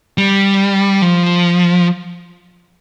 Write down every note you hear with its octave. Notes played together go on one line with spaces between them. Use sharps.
G3
F3